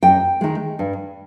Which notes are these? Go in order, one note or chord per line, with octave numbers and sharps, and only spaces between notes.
F#2 G5
D#3 G#3
G2